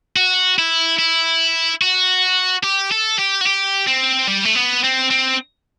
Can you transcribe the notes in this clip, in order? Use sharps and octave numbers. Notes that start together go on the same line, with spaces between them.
F#4
E4
E4
F#4
G4
A4
G4
F#4
G4
C4
G3
A3
B3
C4
C4